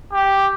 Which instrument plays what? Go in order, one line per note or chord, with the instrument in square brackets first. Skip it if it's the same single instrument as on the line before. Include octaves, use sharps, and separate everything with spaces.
[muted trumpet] G4